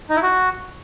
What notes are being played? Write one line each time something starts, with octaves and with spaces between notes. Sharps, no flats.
D#4
E4
F#4